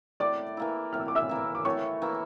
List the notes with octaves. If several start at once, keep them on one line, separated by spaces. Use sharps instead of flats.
A2 D5 D6
E3 A#3 E4
A2 F6
E6
D6
E5 E6
E3 A#3 E4
D6
A2 C#5 C#6
E3 A#3 E4